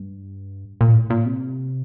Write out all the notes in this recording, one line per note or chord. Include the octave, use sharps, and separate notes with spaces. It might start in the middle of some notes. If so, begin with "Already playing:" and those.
Already playing: G2
A#2
A2
A#2
C3